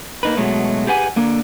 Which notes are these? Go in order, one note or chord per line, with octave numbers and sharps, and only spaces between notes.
A#3 D#4 B4
B2 F#3 G#3 A3
G4 G#4 B4 F#5 G#5
D3 A#3